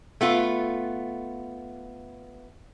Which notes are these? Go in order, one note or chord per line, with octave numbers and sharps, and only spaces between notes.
A3 B3 F4